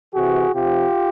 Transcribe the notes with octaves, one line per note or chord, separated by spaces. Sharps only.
C3 E3 F#4 G#4
C3 F3 F4 G4